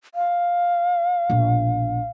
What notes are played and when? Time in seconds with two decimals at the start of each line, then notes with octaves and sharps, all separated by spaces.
0.15 F5
1.30 A#1 B2